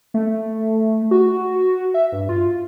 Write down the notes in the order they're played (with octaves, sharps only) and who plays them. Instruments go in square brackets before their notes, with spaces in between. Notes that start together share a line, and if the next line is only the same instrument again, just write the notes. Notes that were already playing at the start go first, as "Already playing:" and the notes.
[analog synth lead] A3
F#4
E5
G2
F4